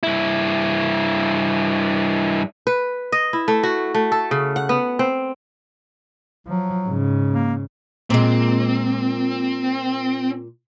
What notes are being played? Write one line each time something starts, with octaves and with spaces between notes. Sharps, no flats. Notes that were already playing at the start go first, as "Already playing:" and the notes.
G2 E4
B4
D#5
E4
A3
F#4
A3
A4
C#3
F#5
B3
C4
F3 F#3
G#2 C#3
A#3
A#2 G#3 C4